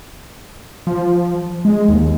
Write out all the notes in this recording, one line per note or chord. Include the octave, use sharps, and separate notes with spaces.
F3
G#3
D#2